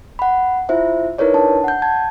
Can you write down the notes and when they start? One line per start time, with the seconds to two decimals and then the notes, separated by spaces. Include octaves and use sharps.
0.19 F#5 B5
0.69 E4 F4 C5 E5
1.18 D#4 E4 A#4 B4 C#5 D5
1.34 D4 A5
1.64 F#5 G6
1.82 A5 G#6